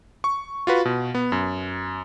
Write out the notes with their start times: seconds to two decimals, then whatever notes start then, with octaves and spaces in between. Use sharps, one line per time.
0.24 C#6
0.67 F4 F#4 B4
0.85 B2
1.15 B3
1.32 F#2